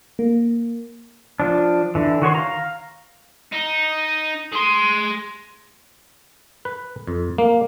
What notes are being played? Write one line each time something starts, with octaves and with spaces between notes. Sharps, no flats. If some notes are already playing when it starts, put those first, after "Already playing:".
A#3
F3 D4
D3 E3
D#3 F#4 C#5 C6
F5 A#5
D#4
G#4 C6
B4
F2
A#3